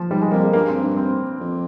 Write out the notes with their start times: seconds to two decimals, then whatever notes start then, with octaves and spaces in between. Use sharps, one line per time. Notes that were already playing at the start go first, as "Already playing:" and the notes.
Already playing: F3
0.10 G#2 G3
0.21 G#3
0.32 F2 A#3
0.43 G#3
0.53 G2 A#3
0.68 C4
0.83 D4
0.97 C4
1.41 F2